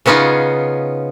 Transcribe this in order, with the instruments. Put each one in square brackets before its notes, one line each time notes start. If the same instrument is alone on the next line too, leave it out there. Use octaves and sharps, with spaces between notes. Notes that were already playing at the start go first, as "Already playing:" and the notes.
[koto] C#3 B3 C#4 D#4 F4